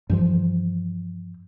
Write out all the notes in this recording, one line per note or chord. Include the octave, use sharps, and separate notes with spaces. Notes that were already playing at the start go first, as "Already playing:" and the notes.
G2 E3 F3